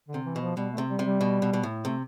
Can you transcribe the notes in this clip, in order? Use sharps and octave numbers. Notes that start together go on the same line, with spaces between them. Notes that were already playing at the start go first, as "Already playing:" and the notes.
D3
C3
E3
B2
F3
B2 G3
A3
C3
G3
C3
G3
B2
B2
B2
A2
C3 A3